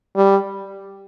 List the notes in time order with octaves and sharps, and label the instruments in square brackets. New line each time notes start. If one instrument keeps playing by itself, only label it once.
[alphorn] G3